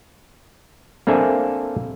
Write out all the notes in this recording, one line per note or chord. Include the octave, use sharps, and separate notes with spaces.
A#3 C4 D4 A4 E5 G#5